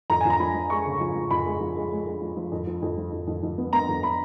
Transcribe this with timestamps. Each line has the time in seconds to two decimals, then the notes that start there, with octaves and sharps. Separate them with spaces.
0.10 F2 A#5
0.21 F2 G#5
0.30 A#5
0.40 F3 B5
0.54 F3
0.70 G#3 C#6
0.85 C#3
1.01 F3
1.15 F3
1.31 F2 B5
1.46 G#3
1.61 F3
1.76 G#3
1.91 G#3
2.06 G#3
2.22 F3
2.37 F3
2.52 F2
2.67 F3
2.82 F2
2.98 F3
3.12 F2
3.27 F2
3.43 F2
3.58 B3
3.73 B3 A#5
3.88 F2
4.03 B5